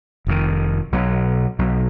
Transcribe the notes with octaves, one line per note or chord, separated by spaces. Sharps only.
F1 F2 D#3
B1 B2 F#3
B1 B2 F#3